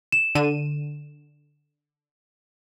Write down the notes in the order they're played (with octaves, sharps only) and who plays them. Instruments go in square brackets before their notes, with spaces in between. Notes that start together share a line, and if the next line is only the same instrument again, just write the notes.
[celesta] E7
[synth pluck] D3 D#7